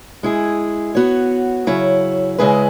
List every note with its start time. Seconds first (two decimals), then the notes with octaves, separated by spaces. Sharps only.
0.23 G#3 E4 G#4
0.95 B3 F#4 C#5
1.67 C#3 F#3 E4 C#5
2.39 C#3 G#3 E4 G#4 B4